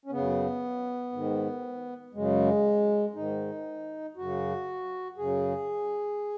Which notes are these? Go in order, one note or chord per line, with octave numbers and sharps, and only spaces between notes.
C#4
F#2 C#3 B3
G#2 D#3
F#2 C#3 G#3
G#2 D#3 D#4
F#2 C#3 F#4
F#2 C#3 G#4